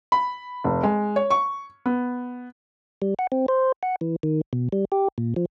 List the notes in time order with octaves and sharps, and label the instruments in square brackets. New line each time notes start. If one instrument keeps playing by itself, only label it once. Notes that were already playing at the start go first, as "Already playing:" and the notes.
[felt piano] B5
F1
G#3
C#5
C#6
B3
[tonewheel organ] G3
F#5
C4
C5
F#5
E3
D#3
B2
G3
G4
A#2
F3